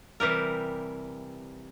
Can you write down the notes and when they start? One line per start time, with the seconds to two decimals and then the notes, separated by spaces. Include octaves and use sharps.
0.20 C3 E3 G3 A#4